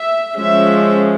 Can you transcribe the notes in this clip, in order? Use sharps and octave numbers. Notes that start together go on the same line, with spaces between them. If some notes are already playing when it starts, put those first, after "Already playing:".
Already playing: E5
F3 G#3 C#4 E5